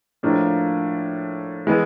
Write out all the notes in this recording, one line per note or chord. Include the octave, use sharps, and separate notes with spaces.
A2 F3 A#3 D4
E3 G#3 B3